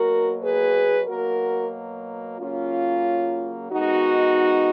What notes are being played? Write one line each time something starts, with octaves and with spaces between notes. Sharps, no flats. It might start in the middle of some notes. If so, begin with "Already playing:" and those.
Already playing: B2 F#3 A#3 F#4 A#4
G#4 B4
B2 F#3 A#3 F#4 A#4
C#3 F#3 A#3 C#4 F4
D#3 G#3 B3 D#4 F#4